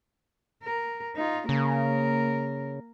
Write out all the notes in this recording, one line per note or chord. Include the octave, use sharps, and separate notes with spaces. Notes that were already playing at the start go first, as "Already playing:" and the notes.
A#4
D#4 F4
C#3 A#3 A#4